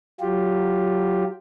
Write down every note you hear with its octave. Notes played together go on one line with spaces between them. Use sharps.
F#3 F4 G4